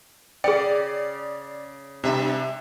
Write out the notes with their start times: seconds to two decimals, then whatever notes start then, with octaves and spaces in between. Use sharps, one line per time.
0.44 C#3 G#4 D5 G5
2.04 G2 C3 E5